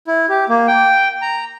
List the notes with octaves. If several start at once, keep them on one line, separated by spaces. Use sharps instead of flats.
E4
G4
A#3
G5
A#5